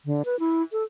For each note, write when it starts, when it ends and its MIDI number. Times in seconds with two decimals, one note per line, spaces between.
0.05 0.22 50
0.25 0.38 71
0.40 0.62 64
0.72 0.84 69